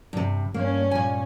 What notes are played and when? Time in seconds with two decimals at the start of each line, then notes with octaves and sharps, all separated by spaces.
0.13 G2 C3
0.54 G2 A#3 C#4
0.91 A#2 G#5